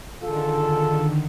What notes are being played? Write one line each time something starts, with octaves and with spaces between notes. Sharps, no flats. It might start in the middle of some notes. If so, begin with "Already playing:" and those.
D3 D#3 F4 G#4 A4